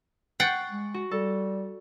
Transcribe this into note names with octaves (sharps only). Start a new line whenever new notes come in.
F#5 G5 C#6 A6 C7
G#3
F#4
G3 A4